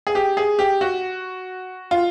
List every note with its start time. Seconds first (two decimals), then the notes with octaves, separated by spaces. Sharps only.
0.07 G#4
0.15 G4
0.37 G#4
0.59 G4
0.81 F#4
1.91 F4